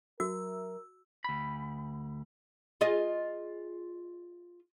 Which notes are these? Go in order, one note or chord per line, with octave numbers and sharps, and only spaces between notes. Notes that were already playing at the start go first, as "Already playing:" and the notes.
F#3 F#4 A#4 E5 E6
D2 B5
F4 G#4 D#5